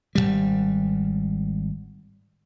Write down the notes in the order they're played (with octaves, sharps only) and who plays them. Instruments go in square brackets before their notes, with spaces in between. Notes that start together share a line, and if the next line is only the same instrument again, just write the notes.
[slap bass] G#1 D#2 G3